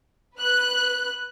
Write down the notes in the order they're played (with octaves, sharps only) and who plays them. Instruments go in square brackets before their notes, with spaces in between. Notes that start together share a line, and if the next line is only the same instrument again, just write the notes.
[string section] B4 F#6